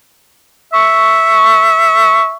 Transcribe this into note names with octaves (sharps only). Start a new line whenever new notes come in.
E5 C#6